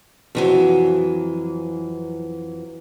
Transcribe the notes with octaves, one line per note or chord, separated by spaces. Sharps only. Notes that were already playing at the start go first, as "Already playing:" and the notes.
F2 E3 F#3